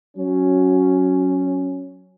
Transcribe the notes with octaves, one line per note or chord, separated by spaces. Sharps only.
F#3 C#4